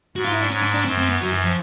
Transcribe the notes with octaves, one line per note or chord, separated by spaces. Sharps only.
G#2 F#4
F4
E4
D4
G#2 C#4
D4
D4
F#2 C4
C4
B3
F#2 F#3
E3
F3